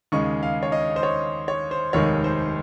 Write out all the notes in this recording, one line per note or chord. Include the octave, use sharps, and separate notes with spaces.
D#2 C#3 G#3 C#6
F5
C#5
D#5
C5
C#5
C#5
C5
F1 D#2 D#3 G#3 C#5
C5